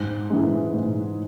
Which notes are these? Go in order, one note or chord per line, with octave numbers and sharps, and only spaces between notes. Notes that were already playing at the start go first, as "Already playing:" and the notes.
Already playing: G#2
E3 G#3
G#2